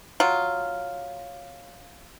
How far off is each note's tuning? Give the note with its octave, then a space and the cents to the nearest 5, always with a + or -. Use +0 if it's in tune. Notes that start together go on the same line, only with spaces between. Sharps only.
F#3 +0 F4 +0